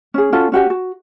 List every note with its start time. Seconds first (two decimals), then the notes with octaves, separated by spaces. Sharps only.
0.14 C#4 G#4
0.33 C#4 F4 F#4 A4
0.52 C#4 F#4 G4 G#5
0.70 F#4